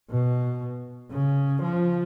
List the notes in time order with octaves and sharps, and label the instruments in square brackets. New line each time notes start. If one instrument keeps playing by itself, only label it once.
[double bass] B2
C#3
F3